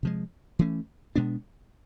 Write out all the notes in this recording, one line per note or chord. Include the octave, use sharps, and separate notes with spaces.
C3 F3 G#3
E3 A3 C#4
B2 G#3 B3 D4